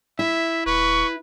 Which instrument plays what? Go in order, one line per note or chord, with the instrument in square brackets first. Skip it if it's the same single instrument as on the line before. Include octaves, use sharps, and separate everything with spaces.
[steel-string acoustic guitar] E4 [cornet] E5
[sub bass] D#1 [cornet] B4 [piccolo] C#6